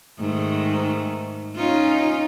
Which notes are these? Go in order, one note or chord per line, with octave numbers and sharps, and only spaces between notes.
G#2 D#3 A3
C#4 D#4 F4